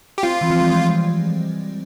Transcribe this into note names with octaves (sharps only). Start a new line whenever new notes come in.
G4
C4 F4
E3
F3
G3
G#3